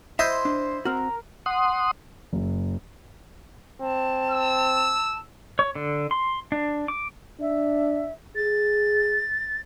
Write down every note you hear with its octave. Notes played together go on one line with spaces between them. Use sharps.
E4 C5 D#5 E5 C6
D4
C4 F#4 A#4
F#5 C6 D#6
F#1
C4 A5
E6
C#5
D3
C6
D4
D6
D4 E5
G#4 A6